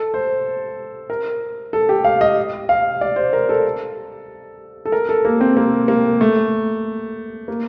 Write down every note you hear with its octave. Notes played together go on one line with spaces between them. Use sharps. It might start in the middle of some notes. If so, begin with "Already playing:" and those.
Already playing: A4
C5
A#4
A4
G4
F5
D#5
F5
D5
C5
A#4
A4
A4
A#4
A4
A#3
C4
A#3
A#3
A3
A#3